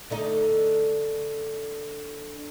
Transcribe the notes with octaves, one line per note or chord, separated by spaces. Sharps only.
D3 A3 D#4